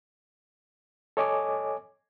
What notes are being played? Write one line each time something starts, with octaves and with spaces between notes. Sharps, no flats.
A4 C#5 D#5 G#5 D6